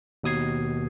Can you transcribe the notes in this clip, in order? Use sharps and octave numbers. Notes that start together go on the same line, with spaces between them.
D#2 B2 D#6 G#6 C7